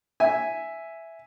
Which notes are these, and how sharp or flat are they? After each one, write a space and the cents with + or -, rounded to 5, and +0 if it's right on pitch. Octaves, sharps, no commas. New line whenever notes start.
E5 +0 G#5 +0